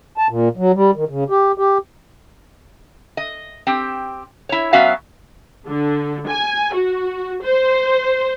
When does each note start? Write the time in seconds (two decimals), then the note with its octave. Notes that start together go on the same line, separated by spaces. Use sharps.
0.17 A5
0.30 A#2
0.57 F#3
0.75 G3
0.95 D#3
1.09 C#3
1.30 G4
1.58 G4
3.17 D#5
3.67 C4 G4
4.49 E4 C#5
4.73 F#3 B3 C#4 F#4 E5 F5
5.67 D3
6.27 G#5
6.73 F#4
7.43 C5